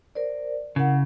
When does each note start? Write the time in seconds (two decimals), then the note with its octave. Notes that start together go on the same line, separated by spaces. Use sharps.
0.15 A#4 C5 D5
0.76 C#3 E4 A#4 F#5